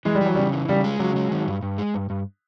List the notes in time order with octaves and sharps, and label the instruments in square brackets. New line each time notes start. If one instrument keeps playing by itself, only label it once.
[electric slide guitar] E3 [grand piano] G#3
[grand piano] G3
[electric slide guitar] E3 [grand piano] F#3
[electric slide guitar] C#3 [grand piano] G3
[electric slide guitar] E3
[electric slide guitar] C#3 [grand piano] G3
[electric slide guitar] G#3
[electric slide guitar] C#3 [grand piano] F#3
[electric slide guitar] G#3
D#3
G2
G2
G#3
G2
G2